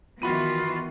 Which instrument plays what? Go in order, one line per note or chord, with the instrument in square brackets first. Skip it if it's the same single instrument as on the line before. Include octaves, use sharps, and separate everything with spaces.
[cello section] D#3 E3 B3 [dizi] F4 [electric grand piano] F#4 B5 D#7